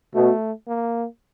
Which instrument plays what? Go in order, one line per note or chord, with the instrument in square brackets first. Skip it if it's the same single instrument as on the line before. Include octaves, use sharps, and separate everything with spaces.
[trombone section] B2 [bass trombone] A3
[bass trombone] A#3